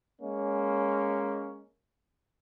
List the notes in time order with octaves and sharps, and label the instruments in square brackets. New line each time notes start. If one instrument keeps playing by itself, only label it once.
[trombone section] G#3 A#3 C#4